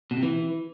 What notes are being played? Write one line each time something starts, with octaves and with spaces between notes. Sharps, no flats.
B2
C3
E3